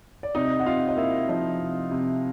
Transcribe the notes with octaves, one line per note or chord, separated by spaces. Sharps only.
D5
C3 D#4 D#5
F#5
C3 F4 F5
D#5
A#3 E4 E5
F3 D#4 D#5
C3
C3